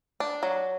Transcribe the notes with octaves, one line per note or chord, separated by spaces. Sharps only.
D4
F#3